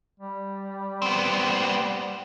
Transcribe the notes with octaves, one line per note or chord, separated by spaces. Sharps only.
G3
B3 C4